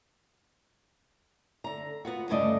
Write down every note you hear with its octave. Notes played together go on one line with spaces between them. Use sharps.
D3 A#5
B3 F4 F#4
D2 G2 C#3 A3 D5 D#5